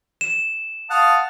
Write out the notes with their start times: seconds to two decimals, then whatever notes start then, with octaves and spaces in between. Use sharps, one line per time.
0.21 E7
0.90 F5 F#5 A5 D#6